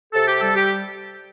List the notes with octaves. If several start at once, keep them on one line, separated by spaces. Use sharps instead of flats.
C3 A4
G4
G3 A4
G4